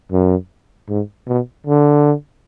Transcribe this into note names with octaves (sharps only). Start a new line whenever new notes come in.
F#2
G#2
B2
D3